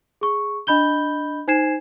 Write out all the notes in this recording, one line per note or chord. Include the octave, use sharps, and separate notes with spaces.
G#4 C#6
D4 D#5 B5 G6 G7
D#4 C5 G#5 G#6 C7 E7